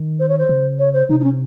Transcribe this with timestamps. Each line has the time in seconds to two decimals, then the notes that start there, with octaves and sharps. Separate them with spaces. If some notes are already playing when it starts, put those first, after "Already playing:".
Already playing: D#3
0.19 C5
0.29 C#5
0.39 C5
0.49 C#3
0.79 C#5
0.93 C5
1.09 C3 D#4
1.20 D#4
1.24 C#4